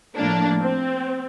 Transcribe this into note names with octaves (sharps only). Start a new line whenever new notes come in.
A2 F3 A#3 D4
C4